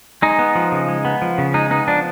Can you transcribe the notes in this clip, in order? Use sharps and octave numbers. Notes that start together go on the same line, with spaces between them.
G#3 D#4
B3
F3
C#3
G#3
B3
F3
C#3
G#3 D#4
B3 D#4
F3 D4